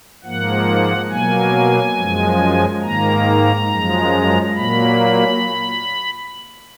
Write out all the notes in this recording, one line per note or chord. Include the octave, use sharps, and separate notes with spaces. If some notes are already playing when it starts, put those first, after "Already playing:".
G#2 F3 A#3 F#5
B2 F#3 A#3 G#5
F#2 F3 G#3
G#2 D#3 A#3 A#5
F#2 F3 G#3
A#2 F#3 A#3 B5